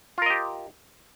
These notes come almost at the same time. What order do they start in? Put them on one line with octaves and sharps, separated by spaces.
F4 A#4 D#5 G4